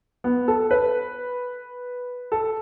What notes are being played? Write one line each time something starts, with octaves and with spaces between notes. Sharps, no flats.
B3
A4
B4
A4